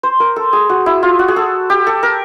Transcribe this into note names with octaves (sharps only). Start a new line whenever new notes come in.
C5
A#4
A4
G#4
F#4
E4
F4
F#4
G#4
A4
G4
A4
A#4